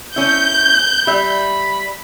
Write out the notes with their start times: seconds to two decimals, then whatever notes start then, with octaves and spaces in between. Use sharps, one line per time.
0.16 C#4 E4 G6
1.07 G3 E5 B5